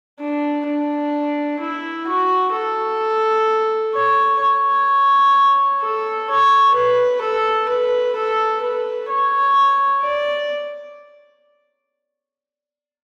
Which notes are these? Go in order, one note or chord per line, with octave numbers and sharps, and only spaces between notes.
D4
D4
E4
F#4
A4
C#5
C#5
A4
C#5
B4
A4
B4
A4
B4
C#5
D5